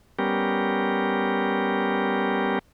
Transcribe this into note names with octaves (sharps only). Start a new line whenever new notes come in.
G3 B3 C#4 G4 A#4